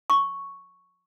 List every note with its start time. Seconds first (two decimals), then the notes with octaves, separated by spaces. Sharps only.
0.10 C#6